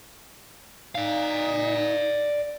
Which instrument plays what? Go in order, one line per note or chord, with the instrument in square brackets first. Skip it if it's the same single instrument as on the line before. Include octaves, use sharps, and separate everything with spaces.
[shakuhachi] D#4 [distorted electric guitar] D5 F5